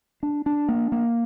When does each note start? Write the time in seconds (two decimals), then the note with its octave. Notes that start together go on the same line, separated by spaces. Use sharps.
0.23 D4
0.46 D4
0.69 A#3
0.92 A#3